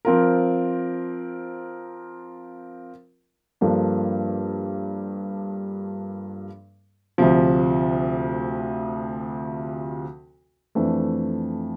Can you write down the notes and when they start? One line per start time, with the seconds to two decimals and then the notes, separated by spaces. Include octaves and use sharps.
0.05 F3 C4 F4 A#4
3.61 G2 F3 A#3 D4 A4
7.18 D2 C3 F3
10.75 F2 E3 A3 D4